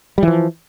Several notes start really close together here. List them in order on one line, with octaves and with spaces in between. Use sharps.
G3 E3 F3